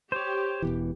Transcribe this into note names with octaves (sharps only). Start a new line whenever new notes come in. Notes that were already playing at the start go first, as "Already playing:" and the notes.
G4 C5 C#5
E1 B2 E3